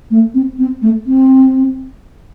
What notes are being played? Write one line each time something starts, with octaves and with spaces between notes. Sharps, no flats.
A3
C4
C4
A3
C4